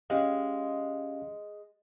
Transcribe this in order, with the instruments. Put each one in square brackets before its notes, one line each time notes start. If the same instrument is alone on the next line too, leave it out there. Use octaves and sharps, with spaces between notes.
[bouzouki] G#3 [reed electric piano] C#4 G4 F5